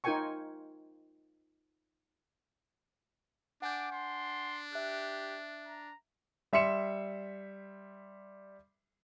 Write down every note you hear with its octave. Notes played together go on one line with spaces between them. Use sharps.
D#4 F4 A#4 G5 G#5 C#6
D4 F#5 G#5 D6 G6
D4 C6
G4 E5 F#6
A#5
G3 E5 C6 C#7 E7